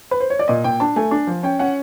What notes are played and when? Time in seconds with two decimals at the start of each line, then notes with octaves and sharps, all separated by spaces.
0.11 B4
0.20 C5
0.30 C#5
0.39 D5
0.48 A#2 D#5
0.64 A#2 G5
0.80 D4 A5
0.96 A3 G#5
1.11 D4
1.27 F3
1.43 C#4 G5
1.59 C#4 F#5